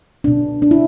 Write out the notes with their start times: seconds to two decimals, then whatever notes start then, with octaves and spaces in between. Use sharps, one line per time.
0.24 B2 B3 D4
0.62 D4
0.71 E4